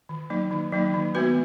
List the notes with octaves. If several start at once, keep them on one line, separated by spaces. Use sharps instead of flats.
D#3
F#3 A#3 D#4
D#3
F#3 A#3 D#4
D#3
G#3 B3 F#4 B4